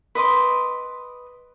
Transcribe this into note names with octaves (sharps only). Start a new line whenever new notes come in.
B4 D#5 C6 D6